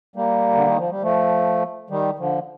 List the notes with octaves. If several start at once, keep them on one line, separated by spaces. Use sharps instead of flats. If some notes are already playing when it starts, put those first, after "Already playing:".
G3 A#3
D3
D#3
F3
G3
F3 A3
D#3 G3
D3 F3